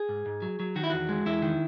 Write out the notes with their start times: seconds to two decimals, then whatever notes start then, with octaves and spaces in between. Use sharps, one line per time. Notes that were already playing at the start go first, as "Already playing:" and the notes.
Already playing: G#4
0.09 G#2
0.26 G#2
0.42 F#3
0.60 F#3
0.76 D#3 F#4
0.84 E4
0.90 E2 F#4
1.09 G#3
1.26 E2 E4
1.42 D#3